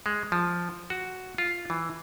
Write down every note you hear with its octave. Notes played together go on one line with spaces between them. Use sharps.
G#3
F3
F#4
F4
E3